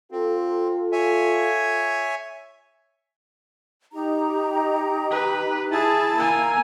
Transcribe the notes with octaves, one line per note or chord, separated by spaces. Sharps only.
C4 F4 A4
C#5 E5 G#5
D#4 G4 A#5
B4
E4 G#4 A5
A#3 G#5 A#5 E6